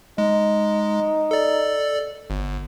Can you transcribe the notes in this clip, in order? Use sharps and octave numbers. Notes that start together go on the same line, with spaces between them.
G#3 D#4
A4 D5
G1